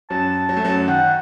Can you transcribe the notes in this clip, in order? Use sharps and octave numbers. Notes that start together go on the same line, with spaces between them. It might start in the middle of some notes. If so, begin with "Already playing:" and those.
F#2 F#3 A5
F#3
A3
F#2 F#3
D#3 F#5